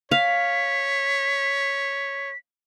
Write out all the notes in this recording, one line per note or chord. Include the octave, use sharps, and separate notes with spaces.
C#5 F5 B6